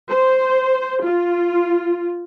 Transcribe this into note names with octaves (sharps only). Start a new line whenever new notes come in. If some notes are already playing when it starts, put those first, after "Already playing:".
C5
F4